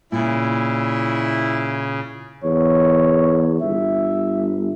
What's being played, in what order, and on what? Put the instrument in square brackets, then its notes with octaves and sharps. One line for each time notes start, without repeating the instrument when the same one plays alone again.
[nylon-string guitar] A#2 [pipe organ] C#3 [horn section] E4
[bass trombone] E2 [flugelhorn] C#5
[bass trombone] G1 [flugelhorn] E5